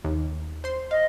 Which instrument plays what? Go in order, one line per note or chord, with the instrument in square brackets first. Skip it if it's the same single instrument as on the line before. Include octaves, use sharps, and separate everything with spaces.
[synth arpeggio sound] D#2
C5 C6
[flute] D#5 [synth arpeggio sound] F5